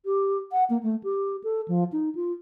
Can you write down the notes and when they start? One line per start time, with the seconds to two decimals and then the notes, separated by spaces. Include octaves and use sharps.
0.06 G4
0.52 F#5
0.70 A#3
0.83 A3
1.03 G4
1.44 A4
1.68 F3
1.92 D#4
2.15 F4